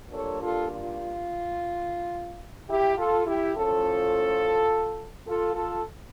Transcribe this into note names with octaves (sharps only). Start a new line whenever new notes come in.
A#2 G3 D4 A4 C#5
F4 A4
F4
E4 G4
F4 A4
E4 G4
A2 F3 C#4 F4 A4
F4 A4
F4 A4